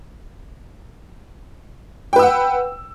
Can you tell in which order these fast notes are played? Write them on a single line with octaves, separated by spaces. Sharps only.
G5 B4 E6 F#5